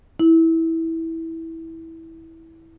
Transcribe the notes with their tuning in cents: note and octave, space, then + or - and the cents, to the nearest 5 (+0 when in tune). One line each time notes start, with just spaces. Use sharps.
E4 -15